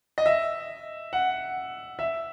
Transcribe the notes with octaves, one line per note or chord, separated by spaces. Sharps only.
D#5
E5
F#5
E5